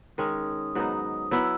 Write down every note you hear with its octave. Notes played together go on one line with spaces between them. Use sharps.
D#3 G#3 C#4 D#6
G#2 F#3 B3 D#4
F#3 B3 E4 E6